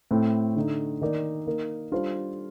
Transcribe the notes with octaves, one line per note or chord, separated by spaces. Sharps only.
A2 A3 C4
D3 A3 D#4
D#3 A#3 D#4 A#4 D5
A#3 D#4 A#4
G3 D4 F4 A4 C5